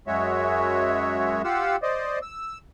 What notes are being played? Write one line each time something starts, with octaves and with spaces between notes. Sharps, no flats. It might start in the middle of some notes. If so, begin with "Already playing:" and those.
F#2 G#3 F#4 C#5 E5
F4 G4 F5 F#5 E6
C5 D5 D#5
E6